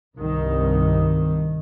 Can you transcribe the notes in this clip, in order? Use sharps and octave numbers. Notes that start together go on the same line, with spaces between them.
C2 G2 D#3